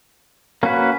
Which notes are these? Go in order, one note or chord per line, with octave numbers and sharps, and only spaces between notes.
A#3 C#4 F#4 B4